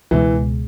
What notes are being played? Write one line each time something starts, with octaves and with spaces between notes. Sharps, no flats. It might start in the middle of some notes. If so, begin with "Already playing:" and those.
C#2 B2 E3 G#3